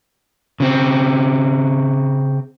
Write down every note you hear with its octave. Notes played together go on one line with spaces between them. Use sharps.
C#3 C4